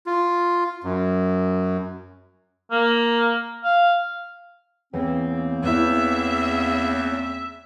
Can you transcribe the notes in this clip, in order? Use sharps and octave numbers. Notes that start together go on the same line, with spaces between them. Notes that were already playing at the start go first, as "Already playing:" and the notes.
F4
F#2
A#3
F5
E2 C#3 A#3 C4
E2 B3 E4 E5